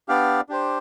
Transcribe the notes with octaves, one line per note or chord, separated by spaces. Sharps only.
B3 D4 G4 D5 F5
D4 G4 C5